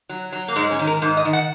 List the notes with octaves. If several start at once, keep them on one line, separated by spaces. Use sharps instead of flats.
F#3
F#3
A#3
G#2 G#3
C#4
D#3
A#4
G#2
D#5
D#3
F#5